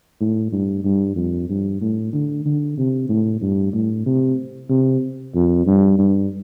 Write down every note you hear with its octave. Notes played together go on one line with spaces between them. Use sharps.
A2
G2
G2
F2
G2
A2
D3
D3
C3
A2
G2
A2
C3
C3
F2
G2
G2